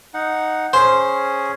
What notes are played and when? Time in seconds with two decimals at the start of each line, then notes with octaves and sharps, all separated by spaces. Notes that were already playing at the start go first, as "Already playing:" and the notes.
0.14 D#4 F#5
0.73 C#4 G#4 C5